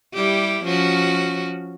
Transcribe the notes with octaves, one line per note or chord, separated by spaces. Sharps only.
G3 E4 G4
F3 C#4 F#4